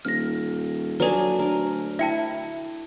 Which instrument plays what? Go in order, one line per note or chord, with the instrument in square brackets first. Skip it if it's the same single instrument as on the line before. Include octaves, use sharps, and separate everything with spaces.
[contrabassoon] D#1 [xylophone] F6 A#6
[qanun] F#3 D4 G#5 [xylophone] A4 B4
[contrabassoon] D2 [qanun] A#4
[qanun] E4 [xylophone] E5 G5 A5